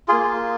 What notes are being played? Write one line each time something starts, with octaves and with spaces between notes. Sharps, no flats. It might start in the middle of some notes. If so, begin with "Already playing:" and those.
A#3 F4 G#4